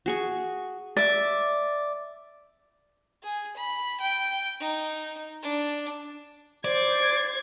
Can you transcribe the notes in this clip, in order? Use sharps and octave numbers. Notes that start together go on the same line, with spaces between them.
F#4 G#4 C#6
D5 E5
G#4
B5
G5
D#4
D4
C5 D5 G#6